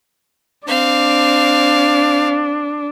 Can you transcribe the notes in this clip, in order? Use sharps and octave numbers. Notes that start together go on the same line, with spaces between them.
C4 D4 F5